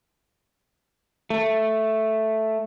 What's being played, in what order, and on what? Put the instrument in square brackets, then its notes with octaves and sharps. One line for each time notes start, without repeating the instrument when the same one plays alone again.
[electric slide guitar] A3